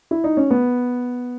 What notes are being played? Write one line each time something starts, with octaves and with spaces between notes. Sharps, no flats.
E4
D#4
C#4
B3